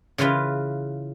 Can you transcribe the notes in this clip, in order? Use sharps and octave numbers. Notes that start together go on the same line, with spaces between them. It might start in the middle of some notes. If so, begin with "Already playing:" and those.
C#3 E3 F4 B4